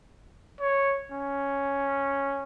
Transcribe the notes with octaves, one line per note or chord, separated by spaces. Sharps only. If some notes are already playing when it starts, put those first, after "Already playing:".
C#5
C#4